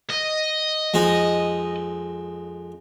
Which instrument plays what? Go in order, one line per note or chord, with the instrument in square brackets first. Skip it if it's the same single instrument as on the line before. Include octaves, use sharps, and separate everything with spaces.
[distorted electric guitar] D#5
[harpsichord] F2 G#3 D#4